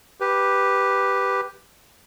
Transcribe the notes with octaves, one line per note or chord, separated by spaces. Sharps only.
G4 B4